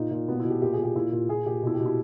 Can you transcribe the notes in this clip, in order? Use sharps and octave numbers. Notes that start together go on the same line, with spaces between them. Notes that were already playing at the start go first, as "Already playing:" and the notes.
Already playing: A#2 D#4
A#2
B2 B3
B2 E4
G4
A#2 G4
G#4
A#2
G4
A#2 E4
A#2
A#2 G#4
A#2 G4
B2 E4
G4
B2
E4